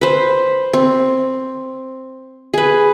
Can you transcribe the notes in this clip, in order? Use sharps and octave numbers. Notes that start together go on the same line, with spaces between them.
B4 C5
C4
G#4 B4